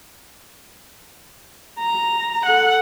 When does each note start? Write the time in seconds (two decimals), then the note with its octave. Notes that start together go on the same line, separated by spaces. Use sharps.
1.80 A#5
2.46 A4 F#5